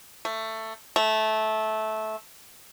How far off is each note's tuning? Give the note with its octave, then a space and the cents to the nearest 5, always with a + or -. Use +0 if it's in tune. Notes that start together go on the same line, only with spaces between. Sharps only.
A3 +15
A3 -15